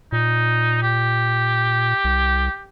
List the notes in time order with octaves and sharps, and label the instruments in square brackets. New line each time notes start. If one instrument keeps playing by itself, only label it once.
[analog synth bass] A#2 [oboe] D#4
[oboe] G4
[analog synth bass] C2